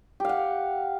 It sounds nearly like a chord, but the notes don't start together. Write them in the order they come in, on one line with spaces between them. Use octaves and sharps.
G4 F5 F#5